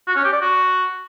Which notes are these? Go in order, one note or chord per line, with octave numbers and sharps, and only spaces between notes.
F#4
C#4
G4
D5
F#4